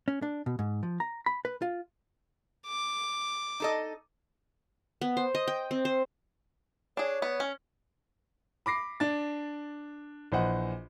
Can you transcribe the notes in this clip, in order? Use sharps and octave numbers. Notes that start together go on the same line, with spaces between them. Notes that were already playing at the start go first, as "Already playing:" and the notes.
C#4
D4
B2
G#2
F3
A#5
B5
B4
F4
D6
D#4 A4 D#5
B3
C5
D#5
G5
C4
C5
D4 G#4 C#5
B3
C#4
B5 D6 A#6 C7
D4 A6
A#1 E3 C5 D#5 F#5